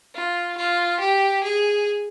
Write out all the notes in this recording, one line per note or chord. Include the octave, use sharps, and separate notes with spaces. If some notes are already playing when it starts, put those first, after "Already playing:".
F4
F4
G4
G#4